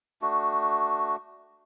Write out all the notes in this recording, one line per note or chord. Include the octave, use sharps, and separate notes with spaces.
A3 D4 F#4